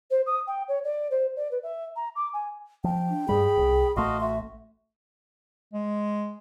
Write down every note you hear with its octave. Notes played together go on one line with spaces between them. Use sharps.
C5
D#6
G5
C#5
D5
C5
D5
B4
E5
A#5
D6
G#5
F3 G5
D4
G2 G3 G#4 B5
D#1 C2
A1 A3 F#4 D#5 F5 C6
F#4 E5
G#3